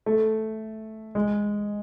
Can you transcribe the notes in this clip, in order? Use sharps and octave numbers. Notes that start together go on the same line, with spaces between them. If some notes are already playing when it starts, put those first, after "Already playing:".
A3
G#3